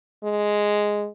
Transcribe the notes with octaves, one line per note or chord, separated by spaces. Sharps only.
G#3